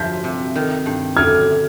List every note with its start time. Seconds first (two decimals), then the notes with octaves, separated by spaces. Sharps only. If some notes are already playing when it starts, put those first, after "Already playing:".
Already playing: G2 F3 G6 B6
0.24 C3
0.55 D#3
0.86 G2
1.17 D3 F6 G#6